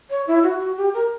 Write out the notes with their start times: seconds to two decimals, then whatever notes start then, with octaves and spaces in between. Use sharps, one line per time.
0.10 C#5
0.27 E4
0.43 F#4
0.60 F#4
0.77 G4
0.94 A#4